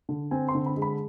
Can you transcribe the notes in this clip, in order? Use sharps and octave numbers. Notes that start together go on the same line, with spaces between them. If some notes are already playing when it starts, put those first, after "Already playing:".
D3
C4 G#5
C6
D3
B5
G#3
B5